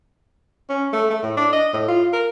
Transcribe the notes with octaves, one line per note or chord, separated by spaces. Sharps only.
C#4
A3
A3
A2
D4
D#5
A2
F4
A#4